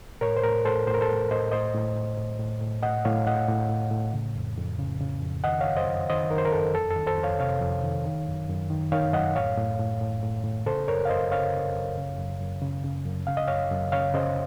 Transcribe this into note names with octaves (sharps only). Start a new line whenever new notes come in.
A2 A#4 C#5
C5
A2 A#4
A2 A4 C5
A2 C5
A#4
A4 C5
A2
A2 C5 D#5
A2 C5 D#5
A2
A2
A2
A2
A2
A2 D#5 F#5
A2 C#5 F5
A2 D#5 F#5
A2
A2
A2
C#3
F2
F2
C#3
C#3
F2
D#3 D#5 F#5
C#5 F5
F#2
C5 D#5
F#2
D#3 C5 D#5
D#3 A#4
C5
A#4
F#2 A4
F2 A4
A4
D#3
A4 C5
F2
C#5 F5
C3 C#5 F5
F2
D#3
D#3
F#2
F#2
D#3
D#3 C#5 F5
F#2 D#5 F#5
A2 C#5 F5
A2
A2
A2
A2
A2
C#3 A4 C5
F#2 A#4 C#5
F5
F#2 C5 D#5
C#3 C#5 F5
C#3
F#2
C#3
F#2
F#2
C#3
C#3
F#2
C#3 F5
D#5
F#2 C#5 F5
F#2
C#3 C#5 F5
C#3 C5 D#5